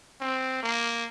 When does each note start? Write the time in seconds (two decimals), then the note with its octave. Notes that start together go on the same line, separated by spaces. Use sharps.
0.21 C4
0.62 A#3